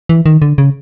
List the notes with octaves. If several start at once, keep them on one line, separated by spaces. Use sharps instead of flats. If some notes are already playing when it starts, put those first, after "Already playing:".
E3
D#3
D3
C#3